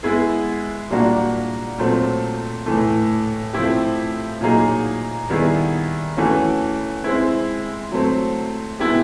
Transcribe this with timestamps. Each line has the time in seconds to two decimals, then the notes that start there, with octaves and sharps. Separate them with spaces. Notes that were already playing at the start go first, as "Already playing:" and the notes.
0.03 G#3 B3 E4 G#4
0.90 A#2 G3 A#3 D4 F#4
1.78 A#2 F#3 A3 C4
2.66 A2 E3 A3
3.53 F3 A3 C4 E4 G4
4.41 A#2 F#3 A#3 D#4 G#4
5.30 D#3 G3 B3 E4 G#4
6.17 E3 A3 C#4 F#4
7.04 G#3 C4 E4
7.92 F#3 A3 C4
8.80 B2 G#3 B3 E4 G4